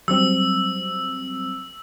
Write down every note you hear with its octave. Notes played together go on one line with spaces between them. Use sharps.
F#3 G3 C4 E6